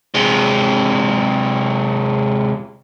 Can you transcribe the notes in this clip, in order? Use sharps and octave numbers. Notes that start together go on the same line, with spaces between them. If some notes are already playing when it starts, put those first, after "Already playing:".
C3 G#3